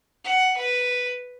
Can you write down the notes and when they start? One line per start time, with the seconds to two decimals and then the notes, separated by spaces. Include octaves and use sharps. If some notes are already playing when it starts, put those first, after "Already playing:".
0.25 F#5
0.57 B4